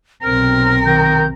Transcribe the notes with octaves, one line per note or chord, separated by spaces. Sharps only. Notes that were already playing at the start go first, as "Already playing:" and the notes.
B1 C3 C4 A#4 F6
D#3 G6